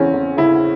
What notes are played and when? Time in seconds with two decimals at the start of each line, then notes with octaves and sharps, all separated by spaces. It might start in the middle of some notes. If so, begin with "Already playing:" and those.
Already playing: E2 C#3 E3 C4 C#4
0.13 E2
0.37 C#3 E4